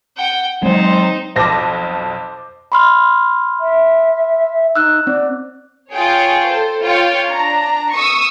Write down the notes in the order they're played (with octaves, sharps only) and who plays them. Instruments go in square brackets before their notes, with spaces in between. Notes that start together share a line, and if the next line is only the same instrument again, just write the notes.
[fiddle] F#5 G5
[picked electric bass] F#3 G#3 [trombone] C4 [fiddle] D#4 C5
[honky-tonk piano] B1 F2 A#6 [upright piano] C5 A5 D6
[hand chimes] B5 C6 F6
[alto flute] E5
[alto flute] D#4 [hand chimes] E6 F#6
[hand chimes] C4 [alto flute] D5
[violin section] F4 G#4 C#5 G5
A4 C5
F4 C#5 G5
D4 A#5
C#6 D#6 E6